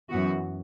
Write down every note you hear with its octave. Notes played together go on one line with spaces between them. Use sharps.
F#2 E3 B3 F#4